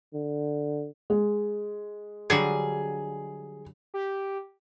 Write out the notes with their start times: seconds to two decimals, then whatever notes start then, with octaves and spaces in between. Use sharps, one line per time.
0.14 D3
1.10 G#3
2.30 D3 F#3 G3 G#4
3.94 G4